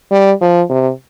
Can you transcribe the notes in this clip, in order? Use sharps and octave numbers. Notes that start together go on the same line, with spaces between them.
G3
F3
C3